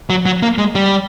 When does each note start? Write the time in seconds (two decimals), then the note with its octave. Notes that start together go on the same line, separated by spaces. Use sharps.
0.10 F#3
0.26 F#3
0.42 A#3
0.58 G#3
0.75 G3